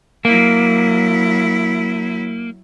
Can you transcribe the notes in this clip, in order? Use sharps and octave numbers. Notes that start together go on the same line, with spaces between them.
F#3 A#3 E4